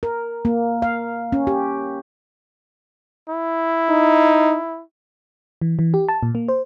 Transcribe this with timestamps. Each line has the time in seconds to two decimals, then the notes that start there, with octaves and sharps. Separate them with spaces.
0.03 A#4
0.45 A#3
0.82 F5
1.32 C#4
1.47 G4
3.29 E4
3.89 D#4
5.61 E3
5.79 E3
5.94 G4
6.09 A5
6.23 A#2
6.35 A#3
6.48 C5